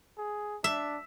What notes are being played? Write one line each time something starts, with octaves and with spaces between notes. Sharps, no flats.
G#4
D4 E5